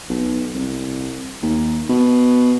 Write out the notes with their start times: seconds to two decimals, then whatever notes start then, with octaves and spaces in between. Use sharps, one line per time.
0.10 B1
0.55 C2
1.43 D#2
1.90 B2